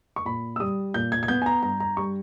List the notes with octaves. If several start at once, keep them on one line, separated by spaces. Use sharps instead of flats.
C#6
A#2 B5
E6
G3 D#6
A#2 G6
G#6
G#6
B3 G6
G#5
A#5
G2 A#5
A#5
G3 C#6